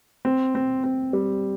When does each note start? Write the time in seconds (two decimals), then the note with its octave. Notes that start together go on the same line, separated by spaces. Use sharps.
0.25 C4
0.55 C4
0.84 C4
1.13 G3